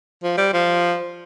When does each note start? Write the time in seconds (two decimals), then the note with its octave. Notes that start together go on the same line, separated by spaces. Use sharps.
0.23 F3
0.38 G3
0.53 F3